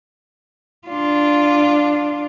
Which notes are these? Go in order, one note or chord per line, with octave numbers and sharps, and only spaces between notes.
D4 F4